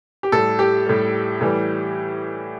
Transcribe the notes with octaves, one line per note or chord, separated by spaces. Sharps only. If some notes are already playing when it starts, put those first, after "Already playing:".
G4
A2 G3 A4
G4
A2 G3
A2 E3 G3